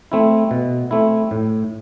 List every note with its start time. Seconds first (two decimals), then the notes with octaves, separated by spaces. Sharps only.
0.12 A3 C4 E4
0.51 B2
0.91 A3 C4 E4
1.31 A2